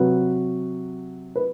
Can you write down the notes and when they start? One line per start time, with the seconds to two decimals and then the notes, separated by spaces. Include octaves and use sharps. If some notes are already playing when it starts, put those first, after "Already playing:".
Already playing: C3 F#3 B4
1.36 B4